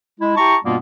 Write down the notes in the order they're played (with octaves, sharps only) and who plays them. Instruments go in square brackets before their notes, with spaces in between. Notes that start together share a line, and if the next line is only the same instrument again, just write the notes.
[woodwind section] G#3 E4
E4 G4 A5 A#5 C#6
G2 B2 G3 A#3 B3 F4